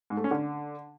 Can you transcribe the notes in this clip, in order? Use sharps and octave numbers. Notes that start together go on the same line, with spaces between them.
G#2
A3
C#4
D3